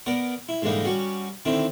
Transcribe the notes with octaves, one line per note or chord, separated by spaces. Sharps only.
B3 A#4 D5
E4
G#2 D3 E3 G3 A#3 D#4
G3 C#4 F#4
D3 D#3 C4 E4